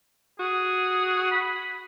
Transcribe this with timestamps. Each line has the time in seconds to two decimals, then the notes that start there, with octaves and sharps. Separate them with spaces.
0.40 F#4 G#4
1.31 B5